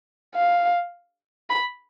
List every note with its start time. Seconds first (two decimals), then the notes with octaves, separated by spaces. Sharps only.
0.35 F5
1.50 B5